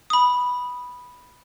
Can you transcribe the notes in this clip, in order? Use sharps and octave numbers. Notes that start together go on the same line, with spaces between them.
B5 D#6